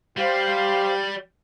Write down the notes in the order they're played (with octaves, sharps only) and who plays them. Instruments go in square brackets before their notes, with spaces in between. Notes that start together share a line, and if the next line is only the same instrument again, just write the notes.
[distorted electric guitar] G3 [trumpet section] G4 [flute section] C5 F5